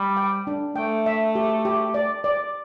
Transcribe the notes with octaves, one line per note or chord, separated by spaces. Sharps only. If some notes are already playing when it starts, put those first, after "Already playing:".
Already playing: G3 B5
G5
D4
A3 G5
E5
G4
G4
D5
D5